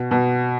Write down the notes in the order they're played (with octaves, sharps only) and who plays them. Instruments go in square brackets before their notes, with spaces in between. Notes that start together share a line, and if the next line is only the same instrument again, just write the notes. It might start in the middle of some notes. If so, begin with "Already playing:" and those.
Already playing: [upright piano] B2
B2